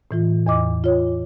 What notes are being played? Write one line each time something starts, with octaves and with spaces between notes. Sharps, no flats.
A2 E3 F4
E2 D#5 D6
F4 C#5